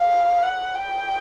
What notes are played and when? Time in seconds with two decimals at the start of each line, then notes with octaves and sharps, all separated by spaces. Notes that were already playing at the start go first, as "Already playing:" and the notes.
Already playing: F5
0.43 F#5
0.75 G5